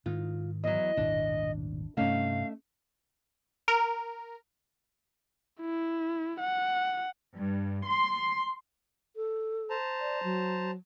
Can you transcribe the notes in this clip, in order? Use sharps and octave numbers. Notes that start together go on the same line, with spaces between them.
G#2 D#3 F4
E2 F#3 D#5
D#1 G#1 B2 D4
G2 C3 A3 C#4 D#4 F5
A#4
E4
F#5
G2
C6
A4
C5 A5 A#5
D5
F#3